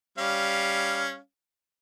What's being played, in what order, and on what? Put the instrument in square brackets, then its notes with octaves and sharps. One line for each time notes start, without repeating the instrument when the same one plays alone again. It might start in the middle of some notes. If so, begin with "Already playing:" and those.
[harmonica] G3 C#4 F5